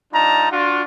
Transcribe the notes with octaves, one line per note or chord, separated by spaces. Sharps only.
G3 D4 D#4 F4 A5 A#5
D4 F4 F#4